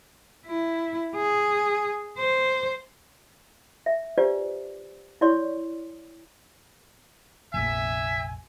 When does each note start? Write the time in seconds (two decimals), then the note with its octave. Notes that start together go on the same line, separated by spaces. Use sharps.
0.46 E4
1.15 G#4
2.18 C5
3.86 E5
4.18 D4 F4 G4 B4 C5 D5
5.21 E4 C#5 D5 C6 C#6
7.54 F1 A#1 E5 G#5